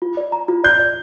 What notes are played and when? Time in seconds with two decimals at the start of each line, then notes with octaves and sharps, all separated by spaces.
0.02 F4
0.17 D5
0.32 A#5
0.48 F4
0.64 D5 G6
0.79 D5